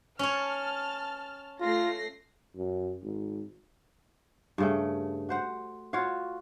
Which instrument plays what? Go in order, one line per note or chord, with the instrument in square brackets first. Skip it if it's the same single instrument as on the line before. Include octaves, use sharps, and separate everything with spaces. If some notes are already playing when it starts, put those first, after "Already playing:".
[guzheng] C#4 C#5 [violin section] A5 F6
[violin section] A3 A#6 C7 [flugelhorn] F4
[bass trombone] F#2
G#1
[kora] G2 C#3 A3
F#4 C5 F#5
F4 F#4 C#5 F5